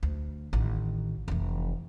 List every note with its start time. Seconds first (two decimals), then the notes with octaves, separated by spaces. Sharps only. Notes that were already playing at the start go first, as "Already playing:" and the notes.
0.03 D2
0.53 A1 D#3
1.28 F1 E3